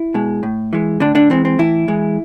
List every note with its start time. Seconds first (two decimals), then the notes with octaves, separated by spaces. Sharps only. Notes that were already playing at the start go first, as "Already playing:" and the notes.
Already playing: E4
0.14 B2 G#3
0.43 A2
0.73 E3 G#3
1.00 A2 D3 D4
1.15 D3 D4
1.30 E3 G#3 C4
1.45 C4
1.59 A2 E3 E4
1.88 E3 G#3